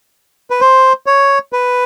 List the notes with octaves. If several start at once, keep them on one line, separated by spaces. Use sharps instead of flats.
B4
C5
C#5
B4